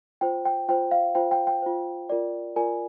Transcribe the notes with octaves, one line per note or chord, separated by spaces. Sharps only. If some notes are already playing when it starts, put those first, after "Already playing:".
F4 C5 G5
G5
F4 C5 G5
F5
F4 C5 G5
G5
G5
F4 C5
F4 A#4 D5
F4 A#4 D5 G#5